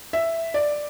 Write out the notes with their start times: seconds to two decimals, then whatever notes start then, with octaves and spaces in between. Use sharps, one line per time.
0.13 E5
0.54 D5